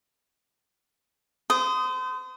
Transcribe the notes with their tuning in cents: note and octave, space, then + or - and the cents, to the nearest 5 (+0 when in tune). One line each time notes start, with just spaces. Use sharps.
C5 -35 D#6 +0